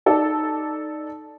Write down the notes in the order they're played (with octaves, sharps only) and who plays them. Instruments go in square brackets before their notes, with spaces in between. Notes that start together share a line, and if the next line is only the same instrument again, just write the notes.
[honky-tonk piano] D#4 A4 D5